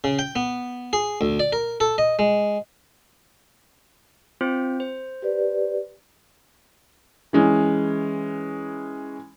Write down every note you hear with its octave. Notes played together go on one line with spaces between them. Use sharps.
C#3
G5
B3
G#4
D2
D5
A#4
A4
D#5
G#3
C4 F4 C5
C5
G4 B4 D5
E3 G#3 C#4